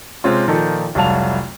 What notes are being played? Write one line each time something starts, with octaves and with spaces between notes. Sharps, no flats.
C3 G#3 C4 C#4 F4
A#2 D#3 F3 D#4 A4
F1 C2 F#3 F5 A5 F7